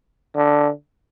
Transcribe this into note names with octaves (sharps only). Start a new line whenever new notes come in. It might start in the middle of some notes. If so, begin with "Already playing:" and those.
D3